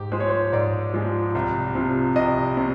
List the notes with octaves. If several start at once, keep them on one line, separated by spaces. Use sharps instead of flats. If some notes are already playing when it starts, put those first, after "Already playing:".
Already playing: G#2 G4
F3 G#3 C5
C#5
C5
G#2 D5
F3 G#3
C2
C3 F3
C2 D#5
C3